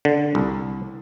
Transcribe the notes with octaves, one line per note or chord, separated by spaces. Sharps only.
D3
C2